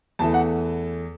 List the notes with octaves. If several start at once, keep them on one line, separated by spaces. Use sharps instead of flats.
E2 E3 A3 A5
F#5